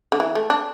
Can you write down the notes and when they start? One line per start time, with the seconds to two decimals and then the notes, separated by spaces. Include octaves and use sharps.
0.12 D3
0.20 E3
0.35 A3
0.50 D4